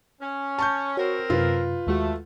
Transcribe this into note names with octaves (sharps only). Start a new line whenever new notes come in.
C#4
A5 C#6 G6
C4 F#4 A#4 C#5
F#2 C3 F4 B4
D#2 G#3 A3 F#4